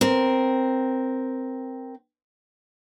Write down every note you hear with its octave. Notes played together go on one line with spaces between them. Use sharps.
C4 A#4